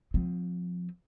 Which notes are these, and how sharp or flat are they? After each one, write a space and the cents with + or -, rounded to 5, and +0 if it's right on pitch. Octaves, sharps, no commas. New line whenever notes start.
F3 +25 C4 -5